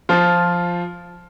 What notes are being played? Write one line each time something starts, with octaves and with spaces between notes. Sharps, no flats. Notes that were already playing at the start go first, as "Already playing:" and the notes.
F3 F4